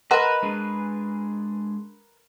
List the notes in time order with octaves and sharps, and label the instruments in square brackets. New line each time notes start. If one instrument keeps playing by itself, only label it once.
[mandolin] A#4 B4 [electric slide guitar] D#5 [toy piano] F#5 A#5 C6
[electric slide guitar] G#3 D4 G#4